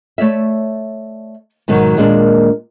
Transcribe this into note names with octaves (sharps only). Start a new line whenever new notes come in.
A3 C#5 D5 E5
G#2 B2 D#3 F#3
D#2 A#2 G#3 A#3 C#4 D4